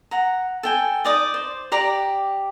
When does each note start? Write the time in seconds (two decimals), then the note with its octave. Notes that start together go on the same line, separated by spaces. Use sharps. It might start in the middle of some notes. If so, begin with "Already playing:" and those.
0.11 F#5 A#5
0.63 A4 G5 G#5
1.04 D#4 D5 D#6
1.34 C5
1.72 G4 D5 A#5